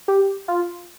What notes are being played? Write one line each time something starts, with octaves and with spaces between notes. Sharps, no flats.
G4
F4